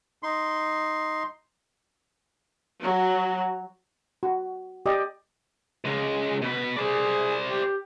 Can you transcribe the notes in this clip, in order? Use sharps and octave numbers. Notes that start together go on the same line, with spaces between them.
D#4 C6
F#3
F#4
G4 D5 D#5
C#2 G#3
B2 B4
G#4 C5 D5
G4